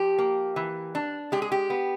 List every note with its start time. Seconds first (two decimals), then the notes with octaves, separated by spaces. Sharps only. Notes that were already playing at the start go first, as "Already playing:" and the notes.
Already playing: F3 G4
0.19 A#3
0.56 E3
0.95 D4
1.32 G#3 G4
1.42 G#4
1.52 G4
1.70 B3